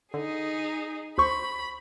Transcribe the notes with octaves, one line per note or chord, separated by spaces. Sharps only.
D3 D#4 G#4
D2 C5 B5 C#6